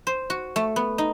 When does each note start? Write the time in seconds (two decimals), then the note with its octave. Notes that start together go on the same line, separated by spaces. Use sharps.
0.07 C5
0.30 F#4
0.56 A3
0.76 B3
0.98 D#4